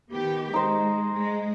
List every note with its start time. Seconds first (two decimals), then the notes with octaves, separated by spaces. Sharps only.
0.12 D#3 B3 G4
0.54 G#3 D#4 C5
1.17 G#3